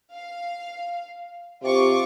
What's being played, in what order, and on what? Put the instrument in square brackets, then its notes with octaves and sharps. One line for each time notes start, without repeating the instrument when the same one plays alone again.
[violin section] F5
[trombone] C3 [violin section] F4 C#6 D6